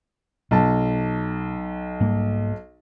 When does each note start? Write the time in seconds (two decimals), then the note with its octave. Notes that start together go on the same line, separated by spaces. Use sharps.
0.51 B1 B2 A5
2.00 G#2 G3 A#3